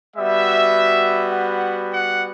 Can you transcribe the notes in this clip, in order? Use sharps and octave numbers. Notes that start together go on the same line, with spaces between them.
G3 B3 F#4 E5
F#5
F#5